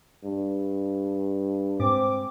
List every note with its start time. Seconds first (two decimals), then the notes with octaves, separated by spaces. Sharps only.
0.24 G2
1.80 G#2 C4 D6